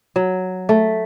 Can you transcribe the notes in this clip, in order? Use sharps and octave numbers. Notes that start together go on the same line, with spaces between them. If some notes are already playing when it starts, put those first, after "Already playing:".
F#3
A3